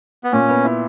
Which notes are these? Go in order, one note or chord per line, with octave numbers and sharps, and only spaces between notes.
B3
A#2 C#4
B3
E4